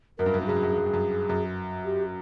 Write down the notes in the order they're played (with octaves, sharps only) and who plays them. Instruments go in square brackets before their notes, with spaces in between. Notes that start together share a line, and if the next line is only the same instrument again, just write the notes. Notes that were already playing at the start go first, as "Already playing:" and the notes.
[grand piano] F#2 [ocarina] A#4
[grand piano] G2
F#2
G2
[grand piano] F#2 [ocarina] G#4
[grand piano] G2
F#2
G2
F#2
G2
F#2
F#2
[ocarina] G4